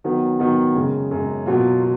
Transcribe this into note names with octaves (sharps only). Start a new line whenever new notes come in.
D#3 F#3 B3
D#3 F#3 B3
F#2 C#3 G#3
F#2 C#3 G#3
B2 F#3 A#3 F4
F4